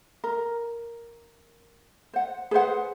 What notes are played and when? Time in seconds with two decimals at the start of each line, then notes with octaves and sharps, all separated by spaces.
0.24 A#4
2.14 C5 F#5
2.51 G#4 B4 C5 F#5